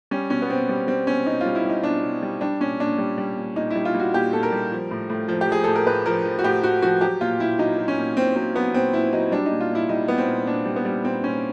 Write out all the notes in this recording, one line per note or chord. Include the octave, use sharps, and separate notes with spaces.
G3 C#4
B2 C#4
B3
B2 C4
G3
G3 C4
B2 C#4
B2 D#4
G3 F4
E4
G3 D#4
B2 D4
B2
G3
G3 D4
A#2 C#4
A#2 D4
G3
G3
A#2
A#2 D#4
G3 E4
F4
G3
F#4
A#2 G4
A#2 A4
A#4
G3
F3
A2
A2
F3
G4
F3 G#4
A2 A4
A#4
A2 B4
F3 A#4
F3
F#4
A2 G4
A2 F#4
F3 F#4
F#3 G4
A#2 F4
A#2 E4
F#3 D#4
F#3
C#4
A#2
A#2 C4
F#3 C4
F#3 B3
A#2 C4
A#2 E4
F#3 D#4
G3 D4
D#4
A#2
F4
A#2 E4
G3 D#4
G3 B3
C4
A#2
A#2 D4
G3
B3
G3
A#2 C4
A#2 C#4